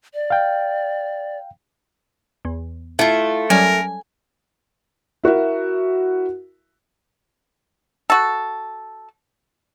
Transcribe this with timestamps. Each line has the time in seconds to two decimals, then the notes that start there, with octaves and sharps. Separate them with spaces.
0.14 D5
0.30 F5 G5
2.45 E2
2.99 A3 E4 F4
3.50 F#3 G3 C#4 A#4 G#5
5.24 E4 F#4 A#4 E5
8.10 F#4 A4